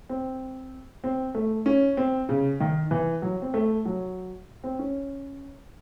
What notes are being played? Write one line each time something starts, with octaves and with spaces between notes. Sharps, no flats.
C4
C4
A3
C#4
C4
C#3
D#3
E3
F#3
C4
A3
F#3
C4
C#4